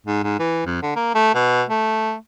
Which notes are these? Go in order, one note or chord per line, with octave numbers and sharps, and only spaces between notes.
G#2
G#2
E3
F2
D3
A#3
A3
B2
A3